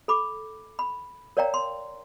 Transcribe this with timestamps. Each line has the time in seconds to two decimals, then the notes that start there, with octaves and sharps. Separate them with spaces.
0.08 A4 B5 D6
0.79 B5
1.37 A#4 C#5 D5 F5 G5 A#5
1.54 C6